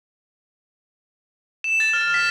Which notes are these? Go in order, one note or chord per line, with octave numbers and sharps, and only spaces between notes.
E7
A6
F6
B6